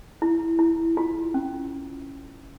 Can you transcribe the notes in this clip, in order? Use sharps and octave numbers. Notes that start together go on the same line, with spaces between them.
E4
E4
F4
C#4